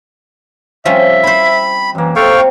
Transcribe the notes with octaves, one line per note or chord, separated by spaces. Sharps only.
F3 G3 C4 C#4 E5
E4 C5 B5
F#2 E3 A#3
C3 A4 F5 G5 C#6